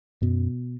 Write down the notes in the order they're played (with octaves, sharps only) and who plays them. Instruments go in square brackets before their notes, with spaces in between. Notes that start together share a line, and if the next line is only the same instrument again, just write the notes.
[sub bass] F#2 [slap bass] B2